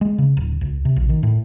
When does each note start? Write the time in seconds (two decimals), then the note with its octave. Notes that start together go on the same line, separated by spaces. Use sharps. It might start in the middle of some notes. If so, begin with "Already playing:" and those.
0.01 G#3
0.18 C#3
0.37 D1
0.61 C#2
0.85 C3
0.96 A#1
1.09 D#3
1.23 A2